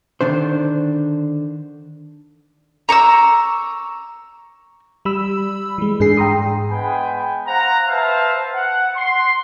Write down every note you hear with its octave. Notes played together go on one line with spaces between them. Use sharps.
D3 D#3 D4 C5
A#5 C#6 D6 E6
G3 B5 E6
E3 G#3
G#2 D4 G#4 C7
G5 A#5 C6 D#6
G#3 B3 G5 G#5 B5
C5 F5 F#5 A#5
B4 C5 E5 F5 A5
F#5
C6